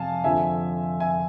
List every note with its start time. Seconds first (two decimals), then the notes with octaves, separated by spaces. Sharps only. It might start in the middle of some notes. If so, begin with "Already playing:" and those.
Already playing: F2 C3 F5 G#5 A5
0.24 F2 D3 F3 E5 G#5
1.00 E5 G#5